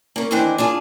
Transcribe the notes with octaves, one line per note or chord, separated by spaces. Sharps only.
A#3 C#4
D#2 E3 D4 D#4 C5 G5
D4 F4 G#4